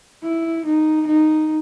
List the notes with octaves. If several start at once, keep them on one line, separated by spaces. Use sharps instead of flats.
E4
D#4
D#4